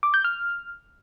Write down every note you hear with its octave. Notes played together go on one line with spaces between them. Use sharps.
D6
G6
F6